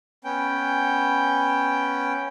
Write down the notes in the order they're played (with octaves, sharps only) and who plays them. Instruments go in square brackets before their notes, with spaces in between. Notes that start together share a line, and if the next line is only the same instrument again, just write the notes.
[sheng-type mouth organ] B3 C#4 G5